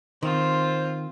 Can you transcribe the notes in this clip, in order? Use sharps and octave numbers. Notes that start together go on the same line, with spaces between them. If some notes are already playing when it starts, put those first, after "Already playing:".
D#3 C4 F4 C5